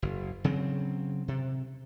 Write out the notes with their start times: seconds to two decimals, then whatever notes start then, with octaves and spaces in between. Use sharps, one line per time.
0.02 F#1
0.44 C#3 F#3 C4
1.28 C3